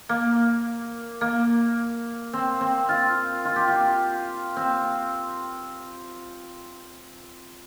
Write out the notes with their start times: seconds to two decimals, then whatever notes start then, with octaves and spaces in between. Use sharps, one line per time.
0.09 A#3
1.21 A#3
2.33 C4
2.61 C4
2.89 F4
3.45 F4
3.56 G4
3.68 F4
4.56 C4